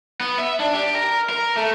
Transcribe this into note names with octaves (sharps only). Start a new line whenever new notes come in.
B3
E5
D4
G4
A#4
A#4
A3